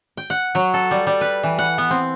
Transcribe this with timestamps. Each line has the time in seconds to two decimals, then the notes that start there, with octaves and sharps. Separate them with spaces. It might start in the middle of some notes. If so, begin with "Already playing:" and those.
0.17 G5
0.30 F#5
0.55 F#3
0.74 A4
0.91 G3
1.07 G3
1.21 B4
1.43 E3
1.59 F#5
1.78 B3
1.90 C4